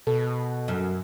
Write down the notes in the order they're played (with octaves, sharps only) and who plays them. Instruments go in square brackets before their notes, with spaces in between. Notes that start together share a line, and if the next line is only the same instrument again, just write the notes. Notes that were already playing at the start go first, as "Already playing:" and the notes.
[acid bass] B2 [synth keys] A4
[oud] F#2